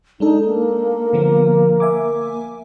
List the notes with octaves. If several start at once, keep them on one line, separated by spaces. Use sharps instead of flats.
G#3 D4 D#4 A4
A#3
D3 F3 B3
E5 G#5 D6